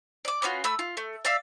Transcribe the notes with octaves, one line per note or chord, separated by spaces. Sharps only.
D5 D6
B3 C#4 F4 F#4
A3 B5 E6
F4
A3
D5 E5 F5 E6